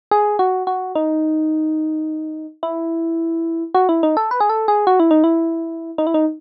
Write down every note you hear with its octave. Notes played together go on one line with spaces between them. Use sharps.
G#4
F#4
F#4
D#4
E4
F#4
E4
D#4
A4
B4
G#4
A4
G#4
F#4
E4
D#4
E4
D#4
E4
D#4